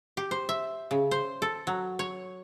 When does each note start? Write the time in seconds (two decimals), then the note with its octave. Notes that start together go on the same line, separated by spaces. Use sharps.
0.17 G4
0.31 C5
0.49 E5
0.91 C#3
1.11 C5
1.42 A4
1.67 F#3
1.99 C#5